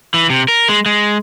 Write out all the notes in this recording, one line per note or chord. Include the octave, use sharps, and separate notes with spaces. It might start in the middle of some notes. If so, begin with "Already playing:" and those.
E3
C3
A#4
G#3
G#3